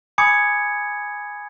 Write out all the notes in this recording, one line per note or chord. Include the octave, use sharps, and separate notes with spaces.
G#5 B5 D6 D#6 G#6 C#7